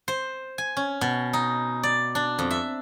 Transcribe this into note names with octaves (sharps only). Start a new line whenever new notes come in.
C5
G#5
C#4
B2
D#4
D5
D4
F2
E5